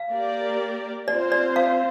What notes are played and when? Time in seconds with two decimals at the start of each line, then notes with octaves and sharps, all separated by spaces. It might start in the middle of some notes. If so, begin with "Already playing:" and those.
Already playing: F5
0.12 A#3 G4 A#4 D5
1.08 C4 F4 C5 D5
1.32 D5
1.56 F5